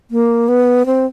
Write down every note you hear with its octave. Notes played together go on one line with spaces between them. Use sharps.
A#3
B3
C4